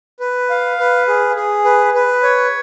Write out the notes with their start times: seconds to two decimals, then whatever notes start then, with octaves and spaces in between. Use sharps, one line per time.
0.20 B4
0.50 F5
0.79 B4
1.08 G#4
1.36 G#4
1.65 B4
1.94 B4
2.23 C#5